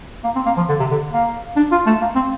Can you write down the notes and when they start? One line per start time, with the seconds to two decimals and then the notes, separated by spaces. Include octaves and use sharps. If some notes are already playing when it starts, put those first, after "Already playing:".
0.24 A#3
0.36 C4
0.46 A#3
0.57 F3
0.69 D3
0.80 C3
0.91 D3
1.13 A#3
1.56 D4
1.72 F4
1.86 A3
2.01 A#3
2.15 C4